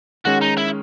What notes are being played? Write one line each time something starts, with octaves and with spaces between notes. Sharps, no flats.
D#3 G#3 C#4 F#4
D#4
E4